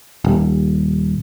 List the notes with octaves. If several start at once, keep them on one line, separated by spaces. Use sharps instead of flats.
D#1